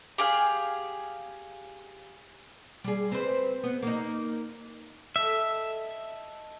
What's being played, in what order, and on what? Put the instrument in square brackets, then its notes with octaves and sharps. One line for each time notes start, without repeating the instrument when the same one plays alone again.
[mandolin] G4 G#4 F5
[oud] G3 G#4
C4 B4 C5
B3
A#3 D#4
[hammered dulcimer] A4 D#5 [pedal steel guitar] E5